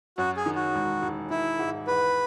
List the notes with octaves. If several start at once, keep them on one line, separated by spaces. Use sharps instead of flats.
F#2 F#4
G#4
D#3
F#4
E1
E1
D#3 E4
G#2
E2 B4